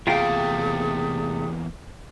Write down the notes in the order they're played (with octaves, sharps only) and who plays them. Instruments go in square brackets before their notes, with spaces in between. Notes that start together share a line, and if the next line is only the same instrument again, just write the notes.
[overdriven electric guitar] E2 A#3 [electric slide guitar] C3 A3 G5 [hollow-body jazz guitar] F4 F5 [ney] G#4